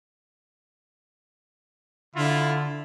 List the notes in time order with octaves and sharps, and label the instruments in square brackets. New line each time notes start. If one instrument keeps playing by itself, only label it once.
[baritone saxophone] D3 [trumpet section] E4 F4